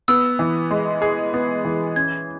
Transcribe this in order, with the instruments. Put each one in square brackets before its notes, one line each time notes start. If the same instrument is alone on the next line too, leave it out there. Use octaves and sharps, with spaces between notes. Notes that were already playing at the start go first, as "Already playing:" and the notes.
[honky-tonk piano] B3 [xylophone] E6
[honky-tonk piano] E3
G#3
G#4
B3
E3
[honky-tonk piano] C#4 [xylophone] G#6